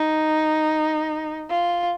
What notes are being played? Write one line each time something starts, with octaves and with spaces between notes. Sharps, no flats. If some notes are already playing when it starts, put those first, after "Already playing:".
Already playing: D#4
F4